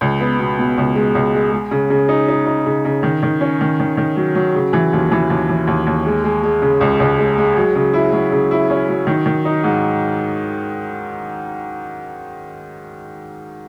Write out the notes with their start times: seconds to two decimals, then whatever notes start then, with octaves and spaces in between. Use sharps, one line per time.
0.01 C#2
0.20 B3
0.39 B2
0.59 B2
0.78 C#2
0.95 G#3
1.15 C#2
1.34 G#3
1.52 G#3
1.71 C#3
1.90 C#3
2.09 D#4
2.29 D#4
2.46 D#4
2.66 C#3
2.85 C#3
3.03 D#3
3.22 D#3
3.41 C#4
3.61 D#3
3.80 D#3
3.97 D#3
4.16 F#3
4.35 F#3
4.55 C#3
4.73 E3
4.93 D#2
5.12 E3
5.30 D#2
5.49 E3
5.67 D#2
5.87 D#2
6.06 G#3
6.24 G#3
6.43 G#3
6.62 C#3
6.81 C#2
7.00 C#2
7.19 G#3
7.38 G#3
7.57 F#3
7.75 C#3
7.93 E4
8.13 F#3
8.32 C#3
8.51 E4
8.70 C#4
8.89 F#3
9.07 D#3
9.26 D#3
9.45 D#4
9.63 G#2